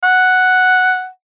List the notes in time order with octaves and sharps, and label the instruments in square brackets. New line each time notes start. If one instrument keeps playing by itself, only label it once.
[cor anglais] F#5